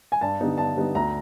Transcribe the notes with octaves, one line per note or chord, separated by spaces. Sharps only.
G#5
G2 A5
D3 G3 B3 D#4
G2 A5
D3 G3 B3 D#4
D2 A#5